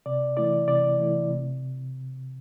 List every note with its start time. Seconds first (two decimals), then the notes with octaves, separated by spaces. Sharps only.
0.06 C3 D5
0.37 E3 A3 E4 D5
0.68 C3 D5
0.99 E3 A3 E4
1.30 C3